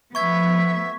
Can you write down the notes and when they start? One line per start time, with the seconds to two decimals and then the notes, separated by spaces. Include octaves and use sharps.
0.15 F3 A3 B3 E5 C#6 G#6